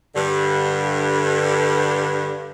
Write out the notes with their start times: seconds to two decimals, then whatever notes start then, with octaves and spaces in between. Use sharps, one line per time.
0.14 G2 D3